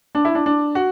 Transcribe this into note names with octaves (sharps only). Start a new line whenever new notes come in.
D4
E4
D4
D4
F#4